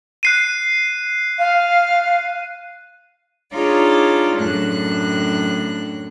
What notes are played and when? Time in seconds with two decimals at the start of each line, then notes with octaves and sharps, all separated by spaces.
0.23 F#6 C7 D#7
1.39 F5
3.52 D4 D#4 F4 G#4 C#5 D5
4.37 F#2 A2 D4 F#6